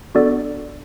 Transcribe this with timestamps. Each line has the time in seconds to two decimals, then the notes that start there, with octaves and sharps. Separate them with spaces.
0.15 B3 D4 F#4 A4 D5